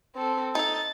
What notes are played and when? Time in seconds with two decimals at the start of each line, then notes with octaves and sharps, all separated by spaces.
0.15 C4 A4
0.55 D#4 A4 A6